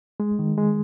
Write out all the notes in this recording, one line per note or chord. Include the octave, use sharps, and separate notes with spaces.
G#3
D#3
G#3